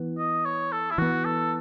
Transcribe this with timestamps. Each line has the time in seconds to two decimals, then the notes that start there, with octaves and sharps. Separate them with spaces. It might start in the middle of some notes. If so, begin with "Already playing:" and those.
Already playing: E3 B3
0.19 D#5
0.45 C#5
0.72 A4
0.91 E4
0.98 E3 B3 F#4
1.25 A4